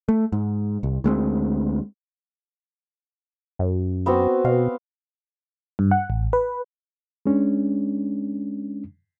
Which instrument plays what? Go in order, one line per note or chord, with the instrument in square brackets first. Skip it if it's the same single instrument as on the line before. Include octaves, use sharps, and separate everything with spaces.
[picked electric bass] A3
G#2
C2
D2 G#3 A3 C4
[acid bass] F#2
[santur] B3 C4 F#4
[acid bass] B2 [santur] F5
[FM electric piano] G2
F#5
A1
B4
[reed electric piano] G#3 C#4 D4